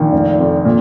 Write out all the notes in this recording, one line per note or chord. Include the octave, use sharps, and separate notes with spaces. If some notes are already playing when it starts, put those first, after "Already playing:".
Already playing: A#1 D#3
F1
F2
A#2